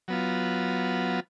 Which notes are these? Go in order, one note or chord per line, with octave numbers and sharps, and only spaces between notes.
F#3 B3 F4